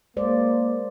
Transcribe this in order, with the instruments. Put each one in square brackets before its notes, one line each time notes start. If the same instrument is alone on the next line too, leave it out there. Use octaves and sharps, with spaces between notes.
[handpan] G#3 C5 D5 [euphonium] A#3